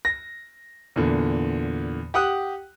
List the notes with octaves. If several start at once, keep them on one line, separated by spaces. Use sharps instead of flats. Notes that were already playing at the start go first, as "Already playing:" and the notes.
A#6
E2 A#2 D3
G4 F#5 D#6 F#6